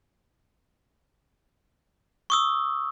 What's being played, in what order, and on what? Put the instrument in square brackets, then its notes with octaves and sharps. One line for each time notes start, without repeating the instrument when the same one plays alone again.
[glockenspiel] C#6 D#6 E6